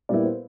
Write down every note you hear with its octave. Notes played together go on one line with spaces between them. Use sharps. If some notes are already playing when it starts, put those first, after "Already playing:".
A#2 G3 B3 E4 D5
C5